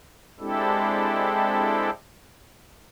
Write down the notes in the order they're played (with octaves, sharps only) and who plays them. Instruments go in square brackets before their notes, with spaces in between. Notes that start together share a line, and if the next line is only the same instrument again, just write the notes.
[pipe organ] G#3 C4 D4 E4 G4 A4